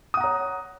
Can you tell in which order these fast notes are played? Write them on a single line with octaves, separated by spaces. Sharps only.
D#6 F#5 A#5 C#5